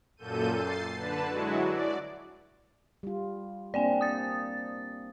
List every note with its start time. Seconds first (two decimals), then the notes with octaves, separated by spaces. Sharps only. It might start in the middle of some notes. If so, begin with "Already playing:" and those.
0.17 F#2 A#2 A4 G6 D#7
0.52 A6 C7
0.96 D3 B4 A5
1.28 F#3 G#3 E4 F#4
1.64 D5
3.03 G3 F4
3.74 A#3 C4 D4 D5 G5 G#5
4.01 D#6 A6